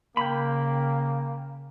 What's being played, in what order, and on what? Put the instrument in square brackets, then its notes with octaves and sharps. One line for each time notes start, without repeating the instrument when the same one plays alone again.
[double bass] C#3 [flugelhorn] A#3 [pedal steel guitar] G5 B5